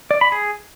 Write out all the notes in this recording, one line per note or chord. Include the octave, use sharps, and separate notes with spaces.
D5
B5
G#4